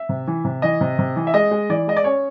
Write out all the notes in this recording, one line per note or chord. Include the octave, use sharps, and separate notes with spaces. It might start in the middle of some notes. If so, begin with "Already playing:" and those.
Already playing: E5
C3
E3
C3
E3 D#5
C3
C3
E3
E5
G#3 D#5
G#3
E3 D5
G#3 D#5
D5
C#4 C#5